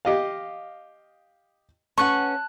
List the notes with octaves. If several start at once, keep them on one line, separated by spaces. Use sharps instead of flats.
G4 D#5 F5
C#4 B4 F#5 A5 C#6 F#6